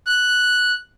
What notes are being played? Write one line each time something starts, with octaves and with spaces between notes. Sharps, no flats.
F#6